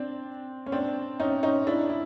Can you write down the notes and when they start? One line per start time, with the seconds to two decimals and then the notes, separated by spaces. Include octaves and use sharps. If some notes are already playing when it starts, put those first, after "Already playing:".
Already playing: C4 D4
0.66 C#4
0.72 C4 D4
1.20 C#4 D#4
1.43 C#4 D#4
1.67 D4 E4
1.90 E4